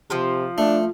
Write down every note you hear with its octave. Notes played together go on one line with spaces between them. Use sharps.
C3 F3 F4 A5
A3 D4